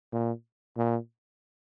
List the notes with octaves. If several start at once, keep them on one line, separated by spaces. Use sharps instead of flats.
A#2
A#2